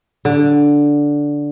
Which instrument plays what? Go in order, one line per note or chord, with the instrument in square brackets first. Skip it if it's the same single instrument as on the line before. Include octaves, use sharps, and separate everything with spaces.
[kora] D3